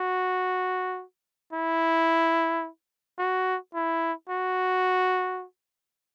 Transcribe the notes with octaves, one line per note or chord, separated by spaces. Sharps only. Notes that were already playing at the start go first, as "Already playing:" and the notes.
Already playing: F#4
E4
F#4
E4
F#4